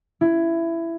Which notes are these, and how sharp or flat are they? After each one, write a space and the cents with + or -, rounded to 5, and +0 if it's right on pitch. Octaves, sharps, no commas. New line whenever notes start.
E4 +15